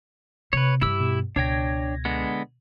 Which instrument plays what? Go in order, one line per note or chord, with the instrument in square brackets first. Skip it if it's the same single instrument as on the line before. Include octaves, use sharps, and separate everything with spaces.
[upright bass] C3 [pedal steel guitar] B4 C#5
[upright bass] G2 G3 [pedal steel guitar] E4 G4 E6
[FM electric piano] B2
[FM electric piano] C#2 G#6 A#6 [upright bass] B2 [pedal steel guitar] D4 C#5 G5
[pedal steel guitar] D3 G#3 B3